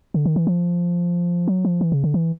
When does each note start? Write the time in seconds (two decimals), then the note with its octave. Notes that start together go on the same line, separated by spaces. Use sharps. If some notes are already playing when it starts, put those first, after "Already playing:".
0.14 D3
0.25 D#3
0.36 E3
0.47 F3
1.48 F#3
1.65 F3
1.81 E3
1.92 C#3
2.04 D3
2.14 E3